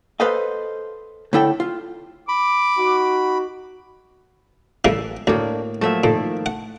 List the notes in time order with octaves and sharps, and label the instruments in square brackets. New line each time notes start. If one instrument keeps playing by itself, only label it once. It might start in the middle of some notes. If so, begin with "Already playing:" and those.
[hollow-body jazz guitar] A4 B4 C5 D#5 F5
A2 D3 E4 A4 G5
F4
[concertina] B5 [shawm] D6
[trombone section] D#4 F#4
[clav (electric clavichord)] A1 [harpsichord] E3 G3 A#3 [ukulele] A4 E5
[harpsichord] D2 [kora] A2 A#3 [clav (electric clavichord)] D4
[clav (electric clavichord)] F3 F#3 A#3 [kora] A3 E5 [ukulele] A4
[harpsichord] A#2 [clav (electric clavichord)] D#3 F3 A#3 [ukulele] A4
[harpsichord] F#5